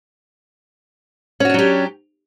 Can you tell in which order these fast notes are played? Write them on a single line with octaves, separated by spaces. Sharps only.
C#4 F#4 D4 F#3 G4